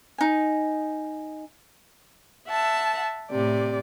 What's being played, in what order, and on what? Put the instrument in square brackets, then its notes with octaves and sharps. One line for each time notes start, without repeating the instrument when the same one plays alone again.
[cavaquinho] D#4 G#5
[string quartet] E5 F#5 A5
A2 C3 D5